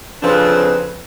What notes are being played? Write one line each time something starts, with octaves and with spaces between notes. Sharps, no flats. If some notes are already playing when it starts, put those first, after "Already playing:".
F2 C#3 F3 C4 D4 B4